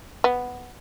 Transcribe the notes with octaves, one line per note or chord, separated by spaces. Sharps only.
B3